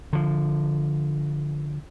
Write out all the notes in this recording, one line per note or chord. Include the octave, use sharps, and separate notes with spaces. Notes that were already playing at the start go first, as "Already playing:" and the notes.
D3 F3